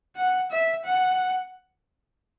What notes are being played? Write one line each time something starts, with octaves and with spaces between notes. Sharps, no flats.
F#5
E5
F#5